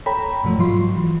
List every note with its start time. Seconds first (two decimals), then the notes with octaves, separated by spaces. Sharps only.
0.06 A4 C#5 G5 A#5 B5
0.44 G2 B2 F3 A3
0.58 G#2 F3 F#3 F4 C6
0.96 E3